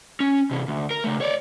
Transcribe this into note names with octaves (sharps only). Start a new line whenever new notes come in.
C#4
C3 E3
D2
A#4
C#3 A3
C#5 D5